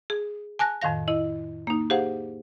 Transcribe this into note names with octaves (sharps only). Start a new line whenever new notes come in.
G#4
G#5 A5 F#6 A#6
F2 A2 D#3 F5 A#6
E4 D#5
A#3 D#4
G4 G#4 C5 F5 F#5